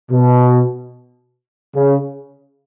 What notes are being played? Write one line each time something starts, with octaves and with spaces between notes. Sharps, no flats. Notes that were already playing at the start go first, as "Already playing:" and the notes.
B2
C#3